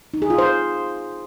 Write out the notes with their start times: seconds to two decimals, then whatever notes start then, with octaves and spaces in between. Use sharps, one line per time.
0.14 D#4
0.22 G#4
0.30 F4
0.38 C5